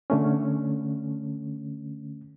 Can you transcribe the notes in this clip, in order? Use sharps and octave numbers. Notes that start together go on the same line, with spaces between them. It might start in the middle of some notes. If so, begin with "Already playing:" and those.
D3 A3 C#4